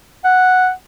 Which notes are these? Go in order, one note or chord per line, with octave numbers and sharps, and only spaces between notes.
F#5